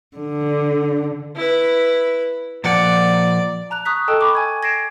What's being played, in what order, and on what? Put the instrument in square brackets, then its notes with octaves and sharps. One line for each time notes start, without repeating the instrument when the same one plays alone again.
[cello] D3
[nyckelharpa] E4 B4
[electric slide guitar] A#2 F3 F#5 [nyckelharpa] D5
[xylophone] A5 A#5 F#6 F7
C#6 D#6 F#6 B6
A4 D#5 G5 A5 E6
B5 C#6 D6
G#5 G#6
G#6 A#6 C7 D7 E7